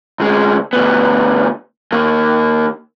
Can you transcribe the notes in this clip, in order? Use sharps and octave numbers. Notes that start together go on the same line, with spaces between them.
D2 G#3
D2 B3
D#2 A#3